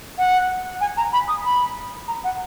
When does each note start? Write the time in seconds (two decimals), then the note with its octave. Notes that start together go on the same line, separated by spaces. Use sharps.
0.18 F#5
0.81 G#5
0.97 A#5
1.13 B5
1.28 D#6
1.45 B5
2.08 A#5
2.24 F#5